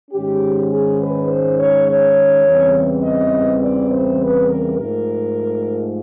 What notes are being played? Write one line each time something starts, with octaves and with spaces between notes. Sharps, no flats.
G#2 D#3 G#3 C#4 G4
G#4
B4
C5
C#5
C#5
E2 C#3 E3 G3 C4
D#5
D5
C5
B4
A#4
G#2 F3 A3 A#4